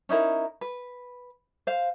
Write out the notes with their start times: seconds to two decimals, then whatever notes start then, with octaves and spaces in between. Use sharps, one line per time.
0.09 C#4 D#4 E4 A#4
0.61 B4
1.67 C5 F5